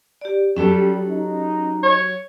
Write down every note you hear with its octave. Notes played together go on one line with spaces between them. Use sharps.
G4 D5
F#3 G3 C#4 G4 A4
D#4
C#5